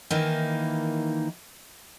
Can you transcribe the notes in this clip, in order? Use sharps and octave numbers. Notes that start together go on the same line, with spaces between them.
D#3 E3 A#3 D#4